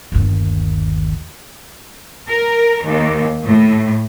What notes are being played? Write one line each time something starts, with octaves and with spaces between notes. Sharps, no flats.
G1 D#2
A#4
D#2
A2